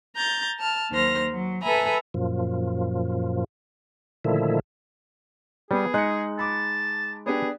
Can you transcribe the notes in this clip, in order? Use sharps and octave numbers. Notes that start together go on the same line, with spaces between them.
A#5 G6 A6
A5 F6
D#2 D#3 F#3 C5 F6 A#6
F#3
A4 B4 E5 G#5 A#5 B5
F#2 A#2 F3
A#2 D3 D#3 F3 A3 E4
G3 B3 G#4
G#3 D#4 F#6 C#7
A5 B5 D6
B3 D4 G4 G#4